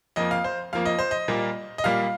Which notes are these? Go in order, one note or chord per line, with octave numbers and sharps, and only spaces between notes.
F2 F3 A#3 D#5
F5
C5
F2 F3 A#3 F5
D#5
C5
D#5
A#2 G3 A#3
D#5
A#2 G3 A#3 F5